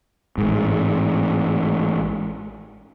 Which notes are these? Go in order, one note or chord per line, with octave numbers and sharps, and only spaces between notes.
A1 G#2